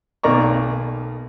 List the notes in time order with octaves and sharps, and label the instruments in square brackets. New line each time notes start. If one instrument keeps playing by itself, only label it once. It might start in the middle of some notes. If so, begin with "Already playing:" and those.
[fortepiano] B1 D#3 A#3 D5 A#5 C#6